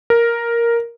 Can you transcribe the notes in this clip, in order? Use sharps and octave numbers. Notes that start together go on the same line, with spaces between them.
A#4